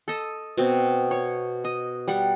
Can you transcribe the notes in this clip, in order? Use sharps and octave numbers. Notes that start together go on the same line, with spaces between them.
A4 D#5
B2 C4
C#5
D#5
G3 F#5